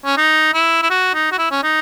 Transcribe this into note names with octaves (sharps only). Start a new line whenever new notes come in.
C#4
D#4
E4
E4
F#4
D#4
F#4
E4
C#4
D#4